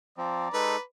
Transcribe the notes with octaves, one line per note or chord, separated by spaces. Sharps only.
F3 C4 D5 A#5
G#3 D#4 A4 B4